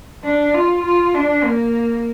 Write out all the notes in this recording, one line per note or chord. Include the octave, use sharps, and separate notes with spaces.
D4
F4
F4
D4
A#3